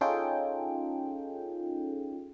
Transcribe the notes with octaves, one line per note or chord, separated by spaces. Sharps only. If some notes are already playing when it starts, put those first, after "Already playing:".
C#4 D#4 F4 G#4 A4 G5